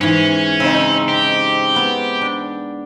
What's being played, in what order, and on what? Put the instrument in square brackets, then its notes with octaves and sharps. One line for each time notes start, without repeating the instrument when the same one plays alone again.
[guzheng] G#2 E3 [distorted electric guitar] C#4
[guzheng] C#3 [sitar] C4 D#4
[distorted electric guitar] G4
[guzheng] B3
D4